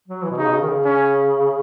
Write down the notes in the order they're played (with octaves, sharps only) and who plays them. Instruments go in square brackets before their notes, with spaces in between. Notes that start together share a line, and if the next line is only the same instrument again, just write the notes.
[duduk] F#3
E3
B2
[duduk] C#3 [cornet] D#4
[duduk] B2
C#3
D#3
C#3
[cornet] C#4